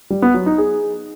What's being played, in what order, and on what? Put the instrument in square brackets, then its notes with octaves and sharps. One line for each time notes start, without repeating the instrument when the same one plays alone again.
[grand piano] G3
B3
F#3
D#4
G#4